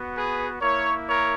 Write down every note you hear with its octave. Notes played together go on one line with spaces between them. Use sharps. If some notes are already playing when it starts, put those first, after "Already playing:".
Already playing: B3 F#4
G#4 B4
A#3 E4 A#4 C#5
A#4 C#5